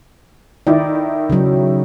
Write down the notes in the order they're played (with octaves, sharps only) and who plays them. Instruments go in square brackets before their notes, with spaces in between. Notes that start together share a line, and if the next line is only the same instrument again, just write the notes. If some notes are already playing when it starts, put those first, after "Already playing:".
[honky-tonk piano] D#3 D#4 E4 [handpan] D5
[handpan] C#3 F#3